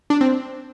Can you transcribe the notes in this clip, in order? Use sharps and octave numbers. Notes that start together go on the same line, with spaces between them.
D4
C4